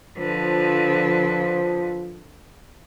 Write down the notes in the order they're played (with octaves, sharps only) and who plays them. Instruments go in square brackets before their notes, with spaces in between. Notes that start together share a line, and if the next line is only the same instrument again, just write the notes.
[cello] D3 B4 [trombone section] F3